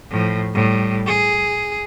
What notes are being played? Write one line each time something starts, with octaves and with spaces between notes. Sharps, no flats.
A2 F3
A2 G3
G#4